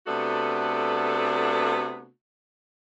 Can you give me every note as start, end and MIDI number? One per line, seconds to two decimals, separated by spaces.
0.06 2.08 48
0.06 2.08 57
0.06 2.08 59
0.06 2.08 62
0.06 2.08 66
0.06 2.08 69